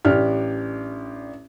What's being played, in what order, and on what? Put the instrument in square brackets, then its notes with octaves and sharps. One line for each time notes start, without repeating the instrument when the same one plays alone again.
[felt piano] A1 D4 G4 F6